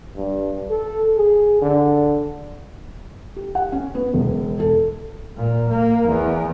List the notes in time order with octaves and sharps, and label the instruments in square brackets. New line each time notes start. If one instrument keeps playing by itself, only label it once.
[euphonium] G2
A4
G#4
D3
[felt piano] G4
F#5
C#4
B3
E1
A4
[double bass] A#2
A#3
E2